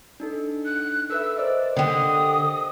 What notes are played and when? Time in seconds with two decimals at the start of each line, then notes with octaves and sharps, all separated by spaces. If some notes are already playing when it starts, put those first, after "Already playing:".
0.20 D4 D#4 A4
0.65 F#6
1.10 A4 B4 E5 E6
1.37 A#4 C5 D5 D#5
1.77 D3 G4 D#6